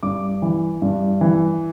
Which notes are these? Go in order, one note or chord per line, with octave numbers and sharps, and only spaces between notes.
G2 D6
E3
G2
E3